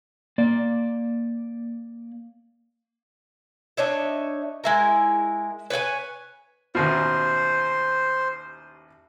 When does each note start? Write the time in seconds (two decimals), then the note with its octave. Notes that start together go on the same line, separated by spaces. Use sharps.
0.38 A#3 D5
3.77 D4 D#4 C#5 E5
4.64 G#3 E4 A#4
5.70 B4 C#5 F#5 G#5
6.75 A1 D#2 B2 C5